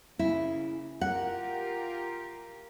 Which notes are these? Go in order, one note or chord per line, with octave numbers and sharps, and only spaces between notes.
C#3 A#3 E4
F4 G4 A#4 F#5